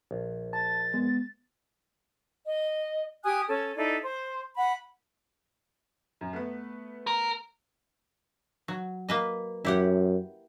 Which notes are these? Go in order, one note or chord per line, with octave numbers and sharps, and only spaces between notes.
A#1
A5 A6
G#3 B3
D#5
G4 G#5 D#6 F#6
C#4 A4
D#4 E4 A4 D5
C5
F#5 B5
F#2
A3 B3 B4
A#4
F#3
A#3 B4 D#5
F#2 E4 G4 F#5